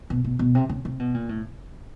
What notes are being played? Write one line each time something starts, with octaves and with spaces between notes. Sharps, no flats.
B2
B2
B2
C3
C#3
C3
B2
A#2
A2